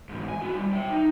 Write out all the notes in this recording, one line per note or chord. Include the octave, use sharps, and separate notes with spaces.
G#2 E3
G#5
E4 F#4
G3
E5 G5
D#4